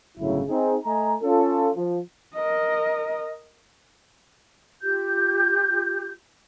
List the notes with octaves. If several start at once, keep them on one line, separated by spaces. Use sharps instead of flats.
G1 A2 C#3 F#3 E4
C4 D#4 G#4
A3 D#5 G#5 A#5
C#4 F4 A4
F3
A#4 D#5
F4 G4 G6